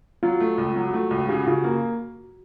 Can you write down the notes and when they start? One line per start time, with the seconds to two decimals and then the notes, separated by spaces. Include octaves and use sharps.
0.23 F#3 F4
0.40 A3
0.58 C#2
0.76 F#3
0.93 A3 F#4
1.11 C#2 F#4
1.29 C#3 G4
1.40 F#4
1.47 C#3 F4
1.64 A#3 F#4